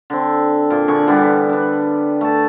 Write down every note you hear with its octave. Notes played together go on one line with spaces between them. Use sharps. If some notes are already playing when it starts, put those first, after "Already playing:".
D3 C4
A#2 C6
D3 G#4 C#6
D3 E3 G3 B3
D4 B4
A3 A5